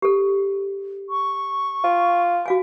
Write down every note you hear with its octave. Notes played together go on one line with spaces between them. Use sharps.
G4 A4
C#6
F4
F#4 F5 G#5